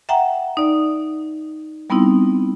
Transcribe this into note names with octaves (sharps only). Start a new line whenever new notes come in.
E5 F#5 G5 A#5
D#4 D5
G3 B3 C4 D#4 E4